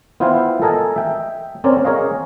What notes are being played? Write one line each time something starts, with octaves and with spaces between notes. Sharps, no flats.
B3 E4 F4 C5 F5 G5
A4 A#4 D#5 G#5 A5
E5 G5
C4 C#4 A#4 C#5 D5
G#4 A#4 C#5 D#5 F5